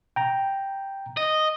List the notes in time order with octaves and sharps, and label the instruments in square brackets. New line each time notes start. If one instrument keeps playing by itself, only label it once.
[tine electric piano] G5 A#5
[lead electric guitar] D#5